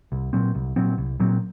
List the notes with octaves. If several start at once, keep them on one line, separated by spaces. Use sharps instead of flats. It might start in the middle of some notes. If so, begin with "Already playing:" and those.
C2
A#2 F#3 C4
C2
A#2 F#3 C4
C2
A#2 F#3 C4